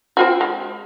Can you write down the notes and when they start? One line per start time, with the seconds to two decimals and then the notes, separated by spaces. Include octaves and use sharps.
0.17 C4 F4 F#4
0.41 G#3